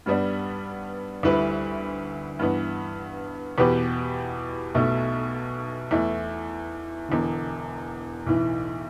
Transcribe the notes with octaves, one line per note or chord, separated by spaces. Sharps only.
G2 G3 B3 D4
D2 D3 G3 E4 B4
G2 E3 B3
E2 B2 B3 G4 B4
B1 B2 A3
E2 E3 A3
E1 E2 D3
B1 A2 E3